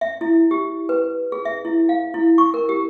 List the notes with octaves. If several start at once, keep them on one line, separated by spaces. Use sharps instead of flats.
E5
E4
G4
B4
G#4
E5
E4
F5
E4
C#6
A#4
G4